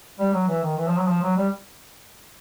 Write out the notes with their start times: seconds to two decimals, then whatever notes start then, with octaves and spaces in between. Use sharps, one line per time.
0.19 G3
0.33 F#3
0.48 E3
0.63 D#3
0.77 E3
0.87 F3
0.97 F#3
1.08 F3
1.22 F#3
1.37 G3